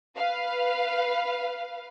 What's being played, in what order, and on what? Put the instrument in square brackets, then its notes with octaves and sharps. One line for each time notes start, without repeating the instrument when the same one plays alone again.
[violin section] B4 F5